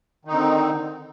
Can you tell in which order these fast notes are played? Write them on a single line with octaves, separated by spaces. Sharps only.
D#3 D#4 D3 C4